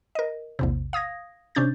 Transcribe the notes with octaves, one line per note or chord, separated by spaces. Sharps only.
A#4 D#5
A#1 E2 C3
F5 D#6 G#6 A#6
C3 C#4 D4 G6 A6